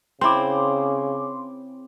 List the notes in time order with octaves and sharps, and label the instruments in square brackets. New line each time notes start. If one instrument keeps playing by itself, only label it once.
[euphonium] C#3 [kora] C4 E4 [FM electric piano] C6 D6